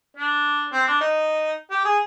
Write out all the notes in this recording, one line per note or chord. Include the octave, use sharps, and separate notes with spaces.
D4
C4
D4
D#4
G4
G#4